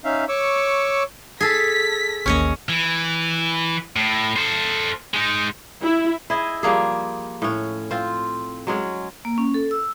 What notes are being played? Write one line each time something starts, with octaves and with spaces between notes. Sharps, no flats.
C#4 D#4 E5 F5
C#5 C#6 D6 E6
G#4 A4 B6
A1 D#2 A#3 C#4 C#5 D#5
E3
A2
A4 C5
G#3 D#4
E4
E4 G#4 D#5
F3 G3 A#3 G#4
A2 C#4
C4 F4
F#3 G#3 C#4
A#3
C#4
A4
E6